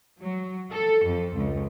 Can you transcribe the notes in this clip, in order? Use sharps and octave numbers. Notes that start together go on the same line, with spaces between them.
F#3
A4
F2
C#2